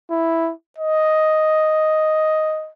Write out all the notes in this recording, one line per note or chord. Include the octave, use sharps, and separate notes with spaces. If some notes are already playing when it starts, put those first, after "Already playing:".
E4
D#5